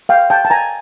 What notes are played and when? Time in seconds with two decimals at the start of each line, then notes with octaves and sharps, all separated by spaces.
0.09 F5 G5
0.30 G5 A5
0.45 A5
0.50 G#5 A#5